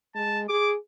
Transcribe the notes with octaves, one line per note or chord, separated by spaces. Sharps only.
G#3 A5
G#4 D6